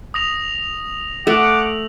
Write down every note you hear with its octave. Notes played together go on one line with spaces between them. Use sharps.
D#6 A#6 F7
A3 F#5 D6 F7 F#7